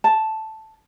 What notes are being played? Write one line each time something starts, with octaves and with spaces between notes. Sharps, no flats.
A5